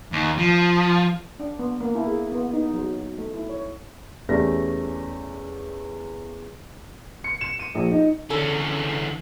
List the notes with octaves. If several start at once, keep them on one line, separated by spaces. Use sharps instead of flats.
D#2
F3
D4
B3
A#3
E4
G#4
B3
D#4
F#3
A3
E4
C#5
E2 A3 C#4 G4 D5 A#6
C#7
E7
D#7
A#1
D#4
E2 D3 C#4 A4